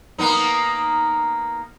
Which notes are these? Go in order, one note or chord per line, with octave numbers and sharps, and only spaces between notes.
A#3 B3 D#4